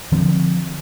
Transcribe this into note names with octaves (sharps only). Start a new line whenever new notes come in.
D3 F3 C4